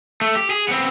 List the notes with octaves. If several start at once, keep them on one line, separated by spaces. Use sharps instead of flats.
A3
G4
G#4
B3 C4